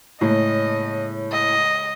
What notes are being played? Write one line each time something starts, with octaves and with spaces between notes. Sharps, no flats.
A2 C#3 G#3 A#3 D#5
D#5